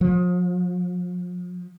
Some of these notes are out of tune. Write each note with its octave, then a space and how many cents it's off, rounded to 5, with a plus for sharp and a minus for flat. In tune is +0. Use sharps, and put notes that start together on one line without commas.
F3 +40